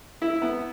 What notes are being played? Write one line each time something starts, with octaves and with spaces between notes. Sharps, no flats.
E4
B3